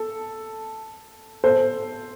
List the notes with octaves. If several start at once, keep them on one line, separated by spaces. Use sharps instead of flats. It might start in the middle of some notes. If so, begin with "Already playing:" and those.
Already playing: A4
A4 C5